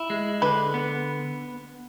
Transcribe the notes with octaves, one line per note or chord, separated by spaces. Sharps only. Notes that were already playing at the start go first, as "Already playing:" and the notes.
Already playing: E4
G#3
D3 B4
B3